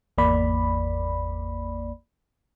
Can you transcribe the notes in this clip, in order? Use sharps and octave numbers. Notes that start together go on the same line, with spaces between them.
G#1 E2 A#3 D5 B5